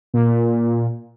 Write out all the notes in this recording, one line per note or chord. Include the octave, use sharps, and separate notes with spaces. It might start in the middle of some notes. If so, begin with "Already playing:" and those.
A#2